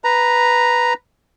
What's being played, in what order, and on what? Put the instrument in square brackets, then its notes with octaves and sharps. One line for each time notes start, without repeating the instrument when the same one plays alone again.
[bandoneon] B4 A#5